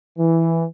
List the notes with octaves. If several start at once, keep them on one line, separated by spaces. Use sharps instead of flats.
E3